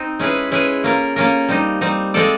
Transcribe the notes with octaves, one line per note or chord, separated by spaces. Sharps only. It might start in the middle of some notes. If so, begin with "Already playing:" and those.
Already playing: C4 D#4
G#3 C#4 E4 G#4 B4
G#3 C#4 E4 G#4 B4
A#3 C#4 F4 A#4
A#3 C#4 F4 A#4
G3 C4 D#4
G3 C4 D#4
G#3 C4 F4 A4 D5